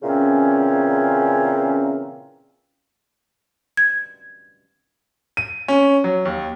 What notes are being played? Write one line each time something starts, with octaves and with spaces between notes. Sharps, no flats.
A#2 C#3 E3 C4 C#4
G#6
D#7
C#4
F#3
D#2